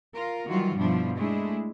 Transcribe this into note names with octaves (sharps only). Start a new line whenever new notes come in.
F4 A#4
D#3 E3 F#3 G3 F4 F#4
G2 B2 F3 D4 E4
G#3 A3 D4 E4